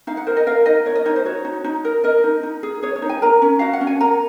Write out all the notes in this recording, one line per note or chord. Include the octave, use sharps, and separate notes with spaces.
D#4 F5
F#5
A#4 C5
D#5
A#4 F5
D#4 D#5
A#4 C#5
D#5
D#4 C#5
C5
F#4 C#5
D#4
D#4
A#4
A#4 D#5
D#4
D#4
G#4
G#4 C#5
C#5
D#4
G#5
A#4 A#5
C#4
F#4 F5
F#5
C#4
G#5
A#4 A#5